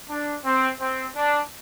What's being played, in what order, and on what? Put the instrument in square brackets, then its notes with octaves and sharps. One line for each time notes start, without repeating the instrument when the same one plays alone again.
[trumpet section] D4
C4
C4
D4